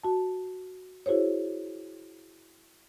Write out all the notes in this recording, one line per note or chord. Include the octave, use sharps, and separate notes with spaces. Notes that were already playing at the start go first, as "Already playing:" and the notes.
F#4 A5
E4 F#4 G#4 C5 C#5